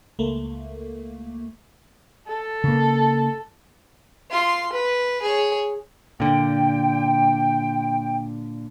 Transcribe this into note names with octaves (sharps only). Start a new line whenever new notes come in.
C#2 A3 A#3
A4
C#3 A#3
F4 C6
B4
G#4 C#5
A#2 D3 G5